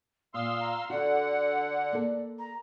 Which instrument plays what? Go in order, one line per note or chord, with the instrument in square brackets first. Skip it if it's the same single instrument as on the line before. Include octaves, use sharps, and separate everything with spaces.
[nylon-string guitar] A#2 [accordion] F5 C6 E6 [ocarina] D#6
[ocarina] A#5
[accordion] D3 F#5 [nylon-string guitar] F#4 [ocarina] D5
[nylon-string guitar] A#3 A4
[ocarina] A#5